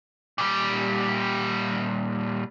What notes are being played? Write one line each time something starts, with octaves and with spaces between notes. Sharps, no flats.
A#2 G3